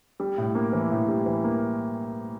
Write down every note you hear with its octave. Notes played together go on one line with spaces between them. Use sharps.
G3
A2
A#3
E3
A2
G3
E3
A#3